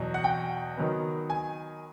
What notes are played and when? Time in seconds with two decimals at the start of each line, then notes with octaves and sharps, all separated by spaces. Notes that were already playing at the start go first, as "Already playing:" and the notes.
Already playing: E2 B2 F#3
0.14 F#5
0.24 G5
0.77 D#3 F#3 B3
1.30 G#5